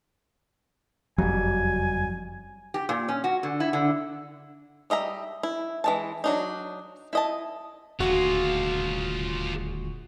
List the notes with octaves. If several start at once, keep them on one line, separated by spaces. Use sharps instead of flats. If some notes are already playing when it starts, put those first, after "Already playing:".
F#1 F2 F#3 G3 G#5
G4
A#2
C#4
F#4
D3
E4
D3
G3 D#5 E5 A#5
E4
E3 G#3 A5
F#3 D4 D#4
E4 D#5 A5
D#1 D2 F4 F#4 G#4